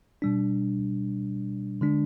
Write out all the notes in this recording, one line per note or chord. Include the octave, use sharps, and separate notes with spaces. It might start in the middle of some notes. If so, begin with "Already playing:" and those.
B2 G3 D4
D3 G#3 D4